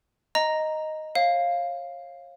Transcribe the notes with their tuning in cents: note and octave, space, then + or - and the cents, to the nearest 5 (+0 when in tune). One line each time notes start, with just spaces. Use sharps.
D#5 +0 A#5 +0
C#5 -40 F5 +0